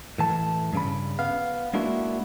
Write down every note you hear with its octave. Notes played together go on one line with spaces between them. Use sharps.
A2 E3 A5
G2 C#3 B5
B3 F5
G#3 A#3 D4 E4 F#4